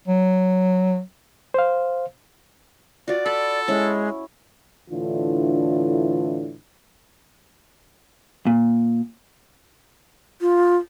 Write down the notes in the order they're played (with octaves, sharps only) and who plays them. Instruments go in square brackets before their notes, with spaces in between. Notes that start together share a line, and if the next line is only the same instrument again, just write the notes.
[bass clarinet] F#3
[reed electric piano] C5 F5
[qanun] F4 F#4 [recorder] D5
[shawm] A4 [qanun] B5
[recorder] G#3 [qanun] C#4 E4
[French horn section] A2 D3 E3 D4 F4
[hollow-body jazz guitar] A#2
[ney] F4